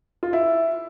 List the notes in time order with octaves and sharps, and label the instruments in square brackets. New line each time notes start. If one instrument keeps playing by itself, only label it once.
[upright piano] F4
E4